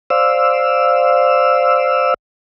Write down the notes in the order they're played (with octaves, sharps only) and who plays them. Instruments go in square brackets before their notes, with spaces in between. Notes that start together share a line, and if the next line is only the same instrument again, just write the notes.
[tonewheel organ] C5 D5 F5 E6